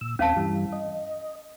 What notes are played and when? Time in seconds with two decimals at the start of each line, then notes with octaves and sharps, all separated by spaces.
0.01 A#2 E6
0.19 D#2 C4 C#4 F5 A5
0.36 G2 E3 G3
0.73 D#5